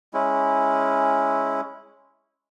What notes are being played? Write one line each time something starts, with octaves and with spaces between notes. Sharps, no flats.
G#3 C#4 E4